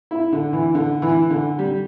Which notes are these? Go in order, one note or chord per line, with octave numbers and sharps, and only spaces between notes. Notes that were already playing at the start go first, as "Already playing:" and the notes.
E4
D3
E3
D3
E3
D3
G3